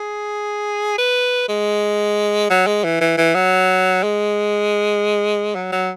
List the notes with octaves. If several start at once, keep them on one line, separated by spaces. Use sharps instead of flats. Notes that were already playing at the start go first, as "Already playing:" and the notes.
Already playing: G#4
B4
G#3
F#3
G#3
E3
E3
E3
F#3
G#3
F#3
F#3